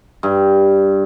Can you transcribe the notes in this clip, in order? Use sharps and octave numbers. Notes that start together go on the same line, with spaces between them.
G2